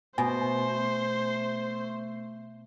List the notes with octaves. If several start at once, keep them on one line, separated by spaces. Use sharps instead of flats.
B2 A3 C5 G#5